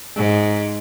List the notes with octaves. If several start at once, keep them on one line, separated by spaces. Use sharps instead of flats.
G#2